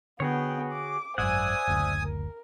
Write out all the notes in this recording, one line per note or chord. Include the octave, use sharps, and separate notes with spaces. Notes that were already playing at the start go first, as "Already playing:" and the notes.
D3 B3 F#4 G#4 C#5 G5
D6
G#1 F#2 C5 D5 E5 F#5 G#5 D#6
F#1 D2
A#4